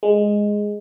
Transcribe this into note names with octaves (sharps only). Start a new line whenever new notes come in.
G#3